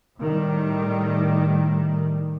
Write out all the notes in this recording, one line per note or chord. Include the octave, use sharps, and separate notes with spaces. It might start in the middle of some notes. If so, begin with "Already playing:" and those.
A2 D#3 G3